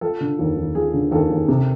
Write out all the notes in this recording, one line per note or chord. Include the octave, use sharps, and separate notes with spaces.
F3 A4
D3
D#2
D#2
F3 G#4
D3
D#2 A4
D#2
C3